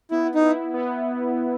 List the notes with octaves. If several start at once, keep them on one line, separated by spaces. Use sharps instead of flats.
B3 E4
D#4
E4
B3